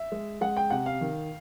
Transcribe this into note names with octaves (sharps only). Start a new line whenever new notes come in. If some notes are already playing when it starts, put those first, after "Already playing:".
Already playing: E5
G#3
G#3 F#5
G5
C3 F#5
F5
D#3